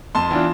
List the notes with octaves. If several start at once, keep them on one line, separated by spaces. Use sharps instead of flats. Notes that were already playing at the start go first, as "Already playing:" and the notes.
F2 A5 C6
E3 B3 D4 F4